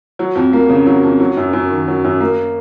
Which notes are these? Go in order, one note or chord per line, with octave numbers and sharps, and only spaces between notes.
F#3
F2
A#3
C#3
F#3
F2
F#3
F#2
F#2
D#3
F#3
F#2
A#3